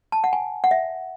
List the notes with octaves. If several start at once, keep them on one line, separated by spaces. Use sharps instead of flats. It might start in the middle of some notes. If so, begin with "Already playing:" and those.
A5
F#5
G#5
F#5
E5